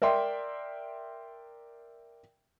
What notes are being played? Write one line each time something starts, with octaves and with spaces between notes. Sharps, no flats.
A#4 D5 E5 G5 C6